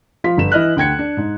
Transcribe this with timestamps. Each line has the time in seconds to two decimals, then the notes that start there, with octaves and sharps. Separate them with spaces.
0.24 F3 F4 B6
0.37 G1 E7
0.52 E3 E4 D#5 F6 F#6
0.77 D2 G5 G#6 C#7
0.99 D4
1.17 G#2